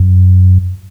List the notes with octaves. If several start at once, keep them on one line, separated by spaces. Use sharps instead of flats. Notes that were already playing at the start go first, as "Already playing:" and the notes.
Already playing: F#2